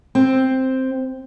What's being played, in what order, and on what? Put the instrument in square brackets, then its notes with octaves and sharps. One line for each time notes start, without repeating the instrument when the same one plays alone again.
[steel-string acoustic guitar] C4